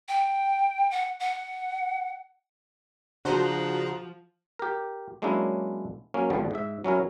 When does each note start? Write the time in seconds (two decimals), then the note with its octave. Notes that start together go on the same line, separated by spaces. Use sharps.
0.08 G5
0.91 F#5
1.20 F#5
3.25 C#3 F3 D4 F#4 G#4 C5 A#5
4.59 G4 A#4
5.22 F#3 G#3 A#3 C#4 D4 E4
6.14 F#3 A#3 C#4
6.30 G#1 G2 D3 F3 G3 B3
6.51 G#2 E5
6.84 F#3 C#4 E4 A#4